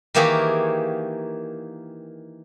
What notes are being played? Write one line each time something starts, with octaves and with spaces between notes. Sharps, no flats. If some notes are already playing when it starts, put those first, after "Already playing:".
D#3 E3 A#3 G4 G#4 C#5